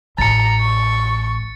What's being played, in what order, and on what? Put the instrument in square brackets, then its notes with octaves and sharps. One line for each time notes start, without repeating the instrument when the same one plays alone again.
[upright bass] A1 [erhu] A#5 [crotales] A6 C#7
[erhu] C#6